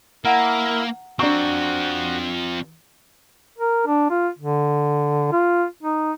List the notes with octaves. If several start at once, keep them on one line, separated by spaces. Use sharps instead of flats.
A#3 E4 A#4 F#5 A#5 F6
F3 C4 D4 F#4 A#5 C#6
A#4
D4
F4
D3
F4
D#4